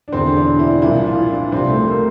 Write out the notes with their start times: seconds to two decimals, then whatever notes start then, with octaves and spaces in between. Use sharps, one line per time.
0.08 D4
0.12 E1 E2 D3 C4
0.37 D4
0.59 E4
0.82 C2 A#2 F3 E4
1.06 F4
1.30 D4
1.52 C2 C3 F3 C4
1.70 A3
1.87 A#3